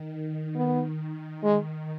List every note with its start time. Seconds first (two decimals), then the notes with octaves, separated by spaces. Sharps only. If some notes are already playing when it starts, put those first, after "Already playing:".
Already playing: D#3
0.56 B3
1.43 G#3